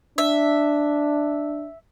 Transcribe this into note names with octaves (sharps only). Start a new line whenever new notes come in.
D4 E5